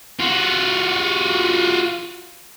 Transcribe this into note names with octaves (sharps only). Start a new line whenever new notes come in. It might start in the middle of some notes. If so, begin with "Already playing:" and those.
F4 F#4